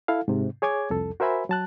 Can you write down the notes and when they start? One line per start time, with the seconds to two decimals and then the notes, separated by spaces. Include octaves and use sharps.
0.08 E4 A4 F5
0.28 G#2 C3
0.62 G#4 C#5 G#5 D6 G#6
0.90 C2 F2 A4
1.20 F#4 A#4 C5 E5 G#5 B5
1.49 F#3 A5 F#6